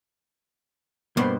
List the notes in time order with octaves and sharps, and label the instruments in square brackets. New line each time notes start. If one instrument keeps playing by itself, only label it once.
[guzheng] G2 B2 [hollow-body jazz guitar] A#3 B3 C5